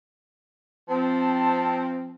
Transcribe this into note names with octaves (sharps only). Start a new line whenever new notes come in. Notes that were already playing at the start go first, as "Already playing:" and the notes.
F3 C4 A5